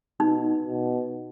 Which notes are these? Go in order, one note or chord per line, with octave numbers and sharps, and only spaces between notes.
B2 D#4
B2